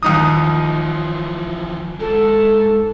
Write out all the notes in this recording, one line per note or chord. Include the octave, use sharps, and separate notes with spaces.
D#2 E3 F3 D#4 D#6
G#2 G#3 A4